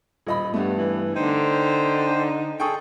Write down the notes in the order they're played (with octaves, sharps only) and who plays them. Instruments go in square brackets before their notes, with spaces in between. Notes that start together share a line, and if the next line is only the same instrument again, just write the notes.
[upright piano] D#1 D#5 B5
[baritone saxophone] G2 [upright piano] A3 B3
[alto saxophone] E3
[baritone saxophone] D3 [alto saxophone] D#4 [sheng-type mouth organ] C5 G5
[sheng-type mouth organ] G#4 A4 [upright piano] G5 C#6 D#6